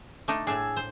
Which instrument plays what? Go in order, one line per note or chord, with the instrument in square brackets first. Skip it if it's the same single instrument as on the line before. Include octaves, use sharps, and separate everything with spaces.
[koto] A3 D4 D#4
[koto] A2 D4 [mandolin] G#4 E6
[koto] C5